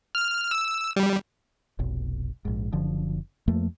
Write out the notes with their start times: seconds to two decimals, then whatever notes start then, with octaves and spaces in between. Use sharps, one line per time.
0.15 F6
0.51 E6
0.96 G3
1.79 F1 B1
2.45 A#1 G#2
2.72 F#1 D3 F3
3.48 F2 F3 A3 A#3